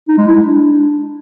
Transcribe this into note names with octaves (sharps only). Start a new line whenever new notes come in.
D#4
G#3
E4
G#3
D4